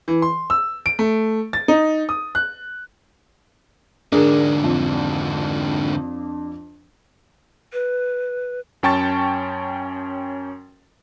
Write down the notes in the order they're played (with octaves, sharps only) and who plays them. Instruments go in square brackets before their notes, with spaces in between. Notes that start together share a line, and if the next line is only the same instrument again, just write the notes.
[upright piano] E3
C6
E6
D7
A3
A6
D#4
D#6
F#6
[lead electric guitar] G#2 D3 [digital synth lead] D4 [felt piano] G#4 A#4
[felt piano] F2
[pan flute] B4
[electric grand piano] F#2 C#4 G5 A5 C#6 A6